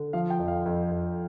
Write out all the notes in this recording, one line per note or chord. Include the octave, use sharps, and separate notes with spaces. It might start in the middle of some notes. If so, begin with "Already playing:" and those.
Already playing: D3
F3 F5
G5
F2
F5
F2
F2